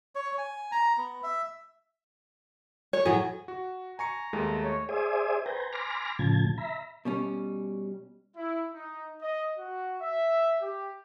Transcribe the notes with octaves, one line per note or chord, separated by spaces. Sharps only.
C#5
G#5
A#5
B3
E5
C#5
A2 F#3 G#4
F#4
G#5 A#5 C#6 C#7
D#2 G#3 A3
C#5
G#4 C5 D5 E5 G#5 D#6
B4 C5 G5 G#5 A#5
G#5 B5 C6 D6 F6 A#6
A2 C#3 F3 A5 G#6
E5 A#5 B5
B2 G3 C#4
E4
D#4
D#5
F#4
E5
G4